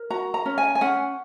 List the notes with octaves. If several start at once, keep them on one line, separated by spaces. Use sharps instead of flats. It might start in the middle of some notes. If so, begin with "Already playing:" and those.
Already playing: A#4
F#4 A#5
A#5
C#4
G#5
G#5
C#4 F#5